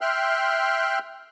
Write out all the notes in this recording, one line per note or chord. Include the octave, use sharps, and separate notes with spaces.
E5 G5 C6 F6 F#6